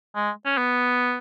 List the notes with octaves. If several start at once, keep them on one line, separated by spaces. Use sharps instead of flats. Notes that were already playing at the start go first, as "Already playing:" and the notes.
G#3
C#4
B3